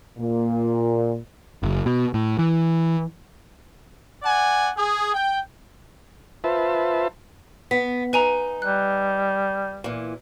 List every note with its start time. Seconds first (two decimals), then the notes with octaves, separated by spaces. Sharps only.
0.18 A#2
1.63 F#1
1.86 B2
2.14 A2
2.39 E3
4.23 D5 F#5 G#5
4.77 G#4
5.14 G5
6.44 F4 B4 C5 E5 A5
7.71 B3 B6
8.13 D#4 B4 G#5 A#5
8.62 G3 F#6
9.84 A#2 E3